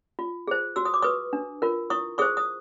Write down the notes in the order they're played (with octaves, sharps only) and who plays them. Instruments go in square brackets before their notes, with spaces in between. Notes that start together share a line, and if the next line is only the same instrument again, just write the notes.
[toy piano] F4
G#4 C5
F#4 E6
D#6
D6
B4 C#6 D#6
D4
F4 A#4
E4 C#6 D#6
G#4 C5 C#6 D#6
D#6